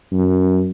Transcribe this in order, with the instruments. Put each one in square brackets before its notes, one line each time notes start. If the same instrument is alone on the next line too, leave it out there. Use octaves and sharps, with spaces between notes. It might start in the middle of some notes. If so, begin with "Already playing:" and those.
[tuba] F#2